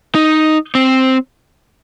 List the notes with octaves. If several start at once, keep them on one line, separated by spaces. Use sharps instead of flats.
D#4
C4